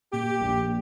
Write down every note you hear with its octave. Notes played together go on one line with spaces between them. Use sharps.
A#2 G4
A#1